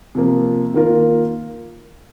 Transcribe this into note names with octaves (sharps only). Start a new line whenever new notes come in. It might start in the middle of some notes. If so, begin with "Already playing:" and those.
C3 F3 A#3
D#3 A#3 F4 A#4